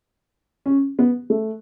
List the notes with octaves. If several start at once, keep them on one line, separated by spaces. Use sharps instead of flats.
C#4
B3
A3